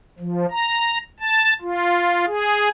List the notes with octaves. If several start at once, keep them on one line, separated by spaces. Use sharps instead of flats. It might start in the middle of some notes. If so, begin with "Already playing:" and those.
F3
A#5
A5
F4
G#4